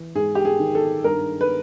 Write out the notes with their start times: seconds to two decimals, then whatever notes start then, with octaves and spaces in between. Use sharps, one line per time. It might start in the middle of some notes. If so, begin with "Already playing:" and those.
Already playing: E3
0.15 G#2 G#4
0.35 G4
0.45 G#4
0.60 D#3
0.75 A4
1.04 G2 A#4
1.41 B4